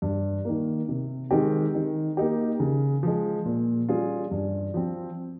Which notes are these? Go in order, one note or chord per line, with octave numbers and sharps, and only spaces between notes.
G2
D#3 A#3
C3
D#3 G#3 C4 G4
D#3
A#3 D#4 G4
C#3
F3 G#3
A#2
G3 C#4 F4 G#4
G2
F3 C4